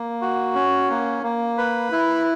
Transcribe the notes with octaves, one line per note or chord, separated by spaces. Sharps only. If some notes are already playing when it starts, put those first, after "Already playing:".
Already playing: A#3
F#4
C#4
A#3
A#3
B4
E4